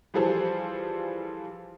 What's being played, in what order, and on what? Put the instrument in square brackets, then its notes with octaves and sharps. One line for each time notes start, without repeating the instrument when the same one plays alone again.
[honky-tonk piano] E3 F3 G3 G#4 A4 C5